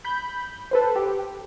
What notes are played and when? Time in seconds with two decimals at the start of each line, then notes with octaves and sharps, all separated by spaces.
0.04 B5 G6
0.71 A4 B4 C5
0.96 G4